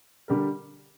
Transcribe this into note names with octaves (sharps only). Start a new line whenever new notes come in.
D3 G3 D4 G4 A#4